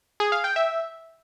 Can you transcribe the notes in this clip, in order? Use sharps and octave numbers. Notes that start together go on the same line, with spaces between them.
G#4
F5
G5
E5